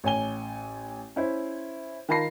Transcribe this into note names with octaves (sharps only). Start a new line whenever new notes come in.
A1 C#5 G#5 G7
C#4 E4 C5
D#3 F4 A5 B5 A#6 C7